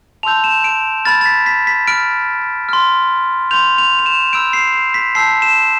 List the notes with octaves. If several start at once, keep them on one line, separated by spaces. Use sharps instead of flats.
A5 C6 E6 G6 F7
E7
D7
B5 F6 A6
A6
B6
B6
B6
B5 F6 D7
C6 F6
C6 G6 F7
F7
F7
E7
B5 E6 G6 D7
C7
C7
B6
A5 E6 G6 C7
E7